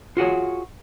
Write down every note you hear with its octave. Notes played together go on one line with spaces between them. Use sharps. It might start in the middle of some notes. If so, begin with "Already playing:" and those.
F4 F#4 G#4 C#5